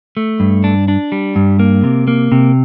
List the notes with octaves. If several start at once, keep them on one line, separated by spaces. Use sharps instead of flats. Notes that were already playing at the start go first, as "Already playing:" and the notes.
A3
G2
D4
D4
G3
G2
A#3
C3
A#3
C3